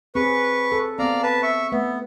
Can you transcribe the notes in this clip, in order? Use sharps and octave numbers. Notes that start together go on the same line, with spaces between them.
C4 G#4 B4 C#6
A4
B3 C4 D5 F5 A#5
B4 A5
E5 C#6
A3 B3 E5